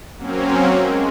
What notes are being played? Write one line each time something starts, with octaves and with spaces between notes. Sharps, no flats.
F#3 A#3 C4 C#4
G#3